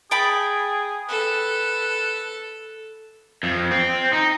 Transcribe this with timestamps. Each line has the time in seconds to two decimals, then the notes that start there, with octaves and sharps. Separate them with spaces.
0.11 G#4 G5 A5 B5
1.09 A4 B4
3.43 F2
3.71 C4
4.13 D#4